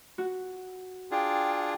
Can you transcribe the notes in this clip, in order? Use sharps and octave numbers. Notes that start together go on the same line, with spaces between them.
F#4
D4 F4 G#4 G5